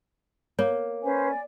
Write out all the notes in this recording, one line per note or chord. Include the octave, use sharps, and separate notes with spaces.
A#3 C#5
C#4 B4 C5 G#5
D5